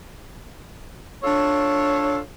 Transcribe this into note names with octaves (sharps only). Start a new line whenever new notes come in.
D4 F4 A4 C#5